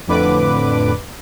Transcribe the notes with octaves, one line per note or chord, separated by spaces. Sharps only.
F2 A2 D3 B4 D6